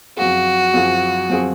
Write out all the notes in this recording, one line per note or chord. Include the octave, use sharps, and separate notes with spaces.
F#2 F3 C4 F4 F#4 G#4
F#2 F3 C4 F4 G#4
F#2 F3 C4 F4 G#4